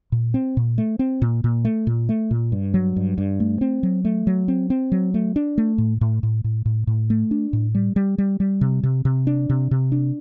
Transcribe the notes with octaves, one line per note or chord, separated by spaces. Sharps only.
A#2
C4
A#2
A3
C4
A#2
A#2
A3
A#2
A3
A#2
G2
F#3
G2
G2
A3
C4
F#3
A3
F#3
C4
C4
F#3
A3
D4
A3
A2
A2
A2
A2
A2
A2
A3
D4
A2
G3
G3
G3
G3
C3
C3
C3
D4
C3
C3
D4